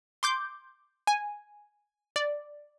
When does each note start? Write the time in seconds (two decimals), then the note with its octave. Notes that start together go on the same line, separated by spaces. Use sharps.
0.23 C6 D6 G6
1.07 G#5
2.16 D5